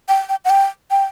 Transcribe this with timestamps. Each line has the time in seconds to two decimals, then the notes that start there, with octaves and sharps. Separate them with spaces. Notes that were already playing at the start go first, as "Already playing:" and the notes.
0.08 G5
0.29 G5
0.45 F#5
0.50 G5
0.91 G5